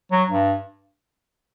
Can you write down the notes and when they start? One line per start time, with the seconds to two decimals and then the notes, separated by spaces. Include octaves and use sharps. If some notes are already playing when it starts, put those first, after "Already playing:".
0.12 F#3
0.29 G2